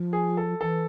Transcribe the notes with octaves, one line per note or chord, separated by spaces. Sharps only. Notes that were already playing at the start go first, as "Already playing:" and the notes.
Already playing: F3
G#4
A4
E3 A4